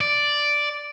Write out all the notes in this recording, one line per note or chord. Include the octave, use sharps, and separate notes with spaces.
D5